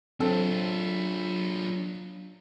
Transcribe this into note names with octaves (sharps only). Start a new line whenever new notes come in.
F#3 C4 D4 F4 A4